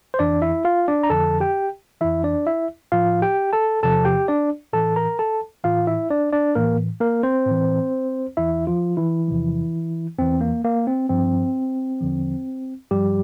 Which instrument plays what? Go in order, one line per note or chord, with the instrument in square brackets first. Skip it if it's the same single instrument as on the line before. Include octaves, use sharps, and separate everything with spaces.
[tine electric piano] C5
F2 E3 D4 D5
E4 E5
F4 F5
D4 D5
A#5
F2 D3 F3 A4 A5
G4 G5
F2 E3 E4 E5
D4 D5
E4 E5
A2 F3 F4 F5
G4 G5
A4 A5
E2 C3 F3 A4 A5
G4 G5
D4 D5
A2 E3 A4 A5
A#4 A#5
A4 A5
A2 E3 F4 F5
E4 E5
D4 D5
D4 D5
A2 E3 A#3 A#4
A#3 A#4
C4 C5
A2 E3
E2 E3 E4 E5
F3 F4
E3 E4
E2 C3 F3
E2 E3 C4
A#3
A#3
C4
G2 F3 C4
E2 D3 F3
G2 F3 G3 G4